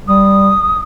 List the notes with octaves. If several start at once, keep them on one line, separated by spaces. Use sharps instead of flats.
G3 D#6